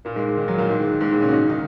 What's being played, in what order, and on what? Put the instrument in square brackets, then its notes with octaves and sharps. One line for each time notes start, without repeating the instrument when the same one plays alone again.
[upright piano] A#2 A#3
G#2 G#3
D#3
F#3
A#2 A#3
G#2 G#3
D#3
G#2 G#3
A#2 A#3
C#3 C#4
F#4
D#3 D#4
D#3 D#4